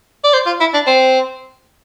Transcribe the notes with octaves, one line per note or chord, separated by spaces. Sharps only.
D5
C5
F4
E4
D4
C4